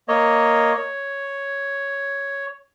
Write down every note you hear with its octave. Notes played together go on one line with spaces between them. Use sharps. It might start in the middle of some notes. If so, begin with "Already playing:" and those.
A#3 C#5 D#5
C#5